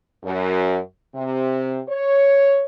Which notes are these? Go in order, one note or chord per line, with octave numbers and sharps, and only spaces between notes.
F#2
C3
C#5